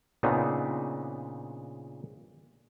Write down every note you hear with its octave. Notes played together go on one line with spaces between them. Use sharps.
A#2 C#3 B3 C4 D4 D#4